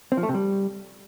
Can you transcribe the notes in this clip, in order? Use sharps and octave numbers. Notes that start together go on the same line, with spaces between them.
C4
F3
A3
C3
G3